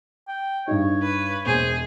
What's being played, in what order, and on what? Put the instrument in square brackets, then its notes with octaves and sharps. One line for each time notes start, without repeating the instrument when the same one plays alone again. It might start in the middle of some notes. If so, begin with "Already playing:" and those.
[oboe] G5
[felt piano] G2 D#4 [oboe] C#5
[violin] B4
[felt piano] E1 [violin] G#4 [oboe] C5